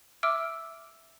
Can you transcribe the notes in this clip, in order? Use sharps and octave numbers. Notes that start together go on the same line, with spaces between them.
E5 D6 E6 F6 D7